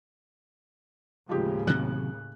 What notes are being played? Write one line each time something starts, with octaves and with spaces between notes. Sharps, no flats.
D#2 A2 C#3 F3 G#3 G4
C3 D#3 F#3 F#6